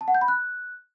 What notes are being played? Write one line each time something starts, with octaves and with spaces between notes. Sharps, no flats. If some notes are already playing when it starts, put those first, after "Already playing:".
A5
F#5
G6
B5
F#6